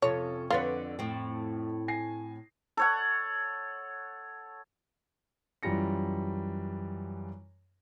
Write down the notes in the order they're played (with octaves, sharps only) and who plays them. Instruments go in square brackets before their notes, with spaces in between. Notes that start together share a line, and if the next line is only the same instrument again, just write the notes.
[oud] F2 C3 C#4 [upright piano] F4 A4 [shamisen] C#5
[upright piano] F2 F#5 A6 [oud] D3 B4 C#5 [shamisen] F4
[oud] A2 C4
[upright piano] G#5 A#6 C7
[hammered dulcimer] A4 C#5 F#5
[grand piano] F#2 E3 G3 F4 A#6 C#7